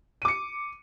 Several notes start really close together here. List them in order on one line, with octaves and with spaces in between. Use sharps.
D#7 D6 C#7